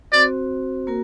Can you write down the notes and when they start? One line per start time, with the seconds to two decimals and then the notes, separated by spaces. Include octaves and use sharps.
0.12 C4 F#4 C5 D5
0.87 A#3 F#4 A#4